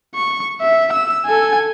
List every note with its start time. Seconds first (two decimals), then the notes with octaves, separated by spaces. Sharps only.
0.15 C#6
0.61 E5
0.93 E6
1.26 A4 G#5